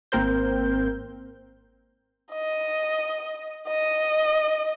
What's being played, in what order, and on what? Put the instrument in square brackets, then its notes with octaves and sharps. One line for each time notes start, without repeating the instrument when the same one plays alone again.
[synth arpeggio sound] G#1 A#3 C4 A#4 C5 G6
[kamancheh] D#5
D#5